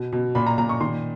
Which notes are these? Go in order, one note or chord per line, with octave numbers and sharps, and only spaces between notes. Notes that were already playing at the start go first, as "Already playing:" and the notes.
Already playing: B2
B2
A#2 B5
A#5
A#2 A#5
C#6
D#3 C6